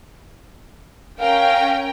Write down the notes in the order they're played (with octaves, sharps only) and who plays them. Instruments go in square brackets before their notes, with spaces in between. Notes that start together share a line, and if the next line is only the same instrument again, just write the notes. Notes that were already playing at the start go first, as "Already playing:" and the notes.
[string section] C#4 A#4 G5 [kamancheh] F5